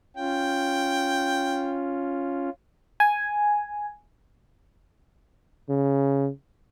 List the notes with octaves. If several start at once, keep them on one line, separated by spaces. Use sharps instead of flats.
C#4 F4 G5
G#5
C#3